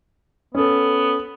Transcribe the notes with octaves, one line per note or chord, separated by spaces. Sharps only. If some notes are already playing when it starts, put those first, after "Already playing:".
B3 C#4 A4